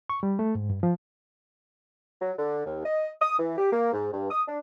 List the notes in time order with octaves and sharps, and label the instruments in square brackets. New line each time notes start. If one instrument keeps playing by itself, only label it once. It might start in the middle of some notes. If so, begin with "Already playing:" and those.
[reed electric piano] C#6
G3
A3
G#2
G2
F3
[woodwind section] F#3
D3
D#2
D#5
D#6
E3
G4
A#3
G#2
G2
D#6
D4